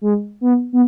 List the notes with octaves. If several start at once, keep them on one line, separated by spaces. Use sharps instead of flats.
G#3
B3
B3